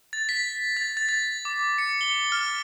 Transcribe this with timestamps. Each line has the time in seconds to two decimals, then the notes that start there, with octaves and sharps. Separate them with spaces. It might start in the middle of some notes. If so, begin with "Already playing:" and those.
0.13 A6
0.29 B6
0.77 A6
0.97 A6
1.09 A6
1.45 D6
1.78 C#7
2.01 G7
2.32 F6